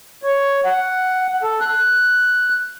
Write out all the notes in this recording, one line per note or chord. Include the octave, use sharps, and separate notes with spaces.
C#5
F#5
A4
F#6